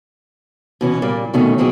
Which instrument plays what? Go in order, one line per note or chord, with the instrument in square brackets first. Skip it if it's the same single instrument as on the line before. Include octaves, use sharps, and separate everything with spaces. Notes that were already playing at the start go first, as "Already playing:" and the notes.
[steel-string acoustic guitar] B2 E3 C#4
A#2 G3 A#3
F2 B2 D#3 A3 C#4
B2 F#3 A#3 C4 G#4